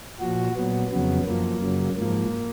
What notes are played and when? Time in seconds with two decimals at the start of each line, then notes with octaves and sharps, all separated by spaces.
0.20 A#2 F3 F#4
0.55 A#2 F#3 B3
0.90 F2 C#3 F#3 B3
1.26 F#2 F3 A#3
1.61 F#2 C#3 F#3
1.96 G#2 F3 A#3